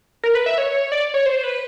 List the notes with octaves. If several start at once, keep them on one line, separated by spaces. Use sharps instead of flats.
A#4
B4
E5
C#5
D5
C#5
C5
B4